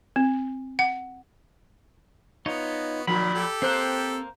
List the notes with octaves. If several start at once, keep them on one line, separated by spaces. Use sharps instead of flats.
C4
F#5
B3 D#4 F4 C#5
A#2 D#3 F3 B5
G4 A4
A#3 C4 C5 F#6